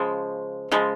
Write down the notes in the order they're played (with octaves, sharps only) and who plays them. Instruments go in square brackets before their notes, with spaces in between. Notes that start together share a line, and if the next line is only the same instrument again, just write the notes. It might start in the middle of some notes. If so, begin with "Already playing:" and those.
Already playing: [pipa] C#3 F3 G#3
C#3 F3 G#3